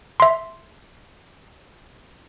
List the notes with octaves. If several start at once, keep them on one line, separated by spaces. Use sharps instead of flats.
E5 C6